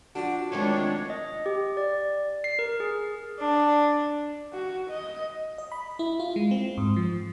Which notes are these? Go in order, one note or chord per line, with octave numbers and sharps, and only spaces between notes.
F3 D4 F#4
D2 C3 D#3 F3 G#3 D4 C#5
D#5
G4
D5
C7
A#4
G#4
D4
F#4
D#5
D#5
B5
E4
F4
G#3
C4
G#2
F3